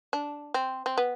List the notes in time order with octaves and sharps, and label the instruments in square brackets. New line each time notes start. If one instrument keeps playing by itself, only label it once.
[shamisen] D4
C4
C4
B3